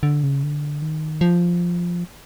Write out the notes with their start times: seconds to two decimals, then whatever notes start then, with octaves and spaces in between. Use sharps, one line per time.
0.03 D3
0.23 C#3
0.43 D3
0.82 D#3
1.21 F3